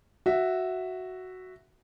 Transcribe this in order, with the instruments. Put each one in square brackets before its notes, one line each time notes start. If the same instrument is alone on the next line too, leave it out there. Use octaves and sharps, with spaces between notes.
[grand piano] F#4 E5